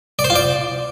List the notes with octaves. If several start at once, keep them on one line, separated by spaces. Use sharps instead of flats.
D5
C5
F4
D5